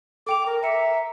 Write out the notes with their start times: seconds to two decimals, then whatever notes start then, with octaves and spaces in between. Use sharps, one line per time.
0.27 A4 G5 D6 F7
0.46 A#4
0.63 E5 A#5 C#7